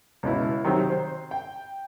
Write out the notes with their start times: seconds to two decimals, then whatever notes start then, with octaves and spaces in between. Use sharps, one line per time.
0.23 C#2 B2 E4
0.64 C3 D#3 F#3 C4
0.90 C5
1.31 G5